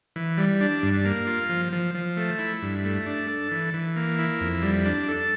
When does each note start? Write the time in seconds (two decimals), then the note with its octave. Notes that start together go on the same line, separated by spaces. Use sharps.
0.16 E3
0.37 G3
0.61 D4
0.83 G2
1.05 A#3
1.27 F4
1.49 F3
1.73 F3
1.95 F3
2.17 A3
2.39 E4
2.62 G2
2.85 A3
3.06 D4
3.28 A4
3.51 E3
3.74 E3
3.96 A#3
4.19 E4
4.41 F2
4.62 G3
4.85 D4
5.08 A4